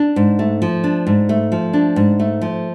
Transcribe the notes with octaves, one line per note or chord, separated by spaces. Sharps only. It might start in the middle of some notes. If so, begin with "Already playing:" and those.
Already playing: D4
G#2
A3
F3
D4
G#2
A3
F3
D4
G#2
A3
F3